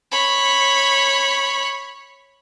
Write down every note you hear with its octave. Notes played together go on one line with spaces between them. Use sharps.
C#5 B5